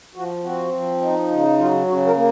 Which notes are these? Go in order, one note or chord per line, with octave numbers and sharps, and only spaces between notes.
F3 F#4
C4 F#4
F3
D#4
C#3
F#3 F4
C#3 F#4
A#4
A#3